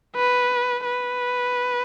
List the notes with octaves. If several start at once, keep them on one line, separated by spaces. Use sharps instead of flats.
B4
B4